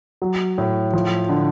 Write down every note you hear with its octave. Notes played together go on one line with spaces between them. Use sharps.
F#3
A2
F3
D3